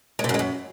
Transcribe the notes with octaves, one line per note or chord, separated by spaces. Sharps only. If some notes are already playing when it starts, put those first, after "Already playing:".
G#3
C3
F#2
G#3
F#2